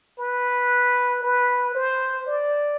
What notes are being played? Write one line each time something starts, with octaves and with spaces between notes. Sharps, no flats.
B4
B4
C5
D5